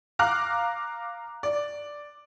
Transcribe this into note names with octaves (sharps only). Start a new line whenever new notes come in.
F5 A#5 D6 F6 F#6
D5